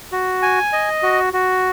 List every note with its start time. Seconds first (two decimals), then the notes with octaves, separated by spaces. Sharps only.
0.12 F#4
0.42 G#5
0.73 D#5
1.03 F#4
1.33 F#4